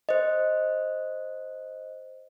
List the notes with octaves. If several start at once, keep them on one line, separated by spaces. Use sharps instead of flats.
C5 D#5